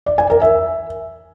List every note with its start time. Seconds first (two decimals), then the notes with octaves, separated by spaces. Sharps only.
0.06 D5
0.18 G#5
0.30 A#4
0.42 E5